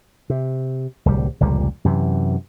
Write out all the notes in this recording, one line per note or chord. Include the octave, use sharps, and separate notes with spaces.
C3
D1 C2 G3
F1 C#2 A#2 G3
F#2 C3 E3